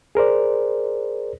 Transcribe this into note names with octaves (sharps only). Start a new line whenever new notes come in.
G#4 A#4 C5 D5